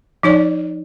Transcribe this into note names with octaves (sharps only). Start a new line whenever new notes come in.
F3 D#4 C#5 D5